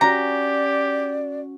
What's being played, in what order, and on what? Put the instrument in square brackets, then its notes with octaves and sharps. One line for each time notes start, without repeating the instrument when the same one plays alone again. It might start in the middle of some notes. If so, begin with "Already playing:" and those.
[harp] C#4 F#4 [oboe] G4 [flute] D5 [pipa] A#5